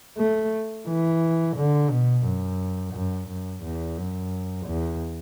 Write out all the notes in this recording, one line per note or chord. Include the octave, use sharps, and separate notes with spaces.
A3
E3
D3
B2
F#2
F#2
F#2
E2
F#2
E2